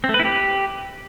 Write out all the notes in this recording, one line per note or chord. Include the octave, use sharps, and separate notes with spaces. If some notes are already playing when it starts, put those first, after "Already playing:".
C4
A3
B4
E4
G4